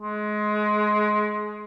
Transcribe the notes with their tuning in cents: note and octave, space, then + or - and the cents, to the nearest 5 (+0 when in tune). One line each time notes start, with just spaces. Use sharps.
G#3 +20